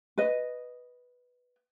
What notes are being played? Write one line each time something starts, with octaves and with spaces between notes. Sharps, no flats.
B4 D#5